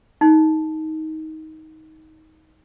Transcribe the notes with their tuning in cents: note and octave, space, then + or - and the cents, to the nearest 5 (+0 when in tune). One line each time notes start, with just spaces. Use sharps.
D#4 +15